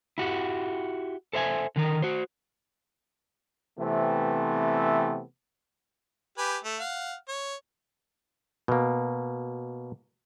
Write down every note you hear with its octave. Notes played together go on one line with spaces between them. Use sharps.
E4 F#4 G4
A4 C5 E5 G5 G#5
D3 D#3 A#4
F#4 C5
C3 E3 A3 B3 C4
G4 B4 G#5
A3
F5 F#5
C#5
B2 A#3